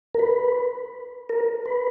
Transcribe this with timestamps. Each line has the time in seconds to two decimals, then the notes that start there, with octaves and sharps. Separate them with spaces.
0.14 A#4
0.19 B4
1.29 A#4
1.65 B4